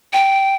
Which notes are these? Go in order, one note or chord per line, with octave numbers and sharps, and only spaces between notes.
G5